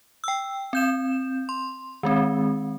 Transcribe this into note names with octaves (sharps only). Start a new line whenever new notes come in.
G5 E6
C4 G6 E7
C6
D#3 G#3 C4